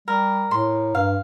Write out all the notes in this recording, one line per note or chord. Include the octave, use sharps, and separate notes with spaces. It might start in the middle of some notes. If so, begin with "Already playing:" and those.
G3 A#4
A2 C6
G2 F5